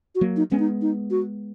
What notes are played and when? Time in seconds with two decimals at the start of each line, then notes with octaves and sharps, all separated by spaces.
0.15 F#4
0.21 F#3 A#3
0.36 D#4
0.51 G#3 B3 C#4
0.59 D#4
0.82 D#4
1.11 F#4